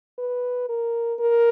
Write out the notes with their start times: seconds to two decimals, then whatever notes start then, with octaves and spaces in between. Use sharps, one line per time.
0.18 B4
0.69 A#4
1.20 A#4